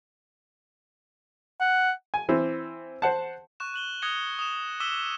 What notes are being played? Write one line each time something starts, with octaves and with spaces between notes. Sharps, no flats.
F#5
G#5
E3 C4
C5 F#5 A5
C#6 F#6 E7
F#6 F#7 G7
D#6 F#6 G#6 A#6 C#7 G7
D#6 E7
D6 E6 B6 D#7 E7 G7